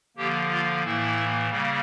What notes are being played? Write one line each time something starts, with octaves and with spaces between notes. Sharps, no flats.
D3 F3 A#3 G4
F4
A2 E3 A#3 E4
C#3 G3 A#3